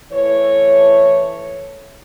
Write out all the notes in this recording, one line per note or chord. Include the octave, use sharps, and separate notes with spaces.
E3 A3 C#5